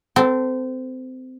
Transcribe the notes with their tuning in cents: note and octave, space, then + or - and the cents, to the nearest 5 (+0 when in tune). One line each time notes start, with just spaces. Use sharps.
C4 -25 A4 +0